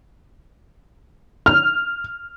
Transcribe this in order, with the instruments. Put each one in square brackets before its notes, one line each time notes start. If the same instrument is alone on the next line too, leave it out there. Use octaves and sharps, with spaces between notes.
[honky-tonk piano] F6